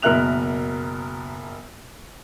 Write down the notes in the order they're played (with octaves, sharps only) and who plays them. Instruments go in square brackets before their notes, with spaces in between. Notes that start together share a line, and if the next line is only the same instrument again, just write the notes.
[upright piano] F#1 B2 A#4 E5 F#6 F7